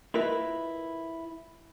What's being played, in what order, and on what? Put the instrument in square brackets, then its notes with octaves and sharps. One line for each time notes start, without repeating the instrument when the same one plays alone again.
[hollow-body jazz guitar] E4 F4 A#4 B4 D#5 E5